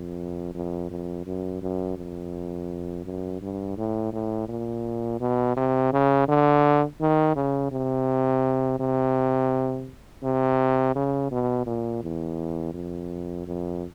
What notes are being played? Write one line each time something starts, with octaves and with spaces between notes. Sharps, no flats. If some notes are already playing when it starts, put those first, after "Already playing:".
Already playing: F2
F2
F2
F#2
F#2
F2
F#2
G2
A2
A2
A#2
B2
C3
C#3
D3
D#3
C#3
C3
C3
C3
C#3
B2
A#2
E2
F2
F2